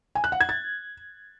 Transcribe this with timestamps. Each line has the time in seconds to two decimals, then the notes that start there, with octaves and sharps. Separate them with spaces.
0.15 G#5
0.24 F#6
0.32 F#5
0.40 G#6
0.49 A6